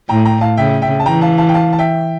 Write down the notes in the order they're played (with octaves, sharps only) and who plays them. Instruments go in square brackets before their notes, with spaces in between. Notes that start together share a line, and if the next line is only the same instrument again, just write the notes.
[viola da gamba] A2 [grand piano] G5 A#5
[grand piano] G5 A#5
F5 A5
[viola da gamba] C#3 [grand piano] E5 G5
[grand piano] E5 G5
A5
[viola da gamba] E3 [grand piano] G5 A#5
[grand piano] F5 A5
F5 A5
G5
F5 A5
A5
E5 G5